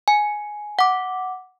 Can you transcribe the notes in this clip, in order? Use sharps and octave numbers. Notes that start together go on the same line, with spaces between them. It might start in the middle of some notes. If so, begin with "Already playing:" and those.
G#5
F#5 D6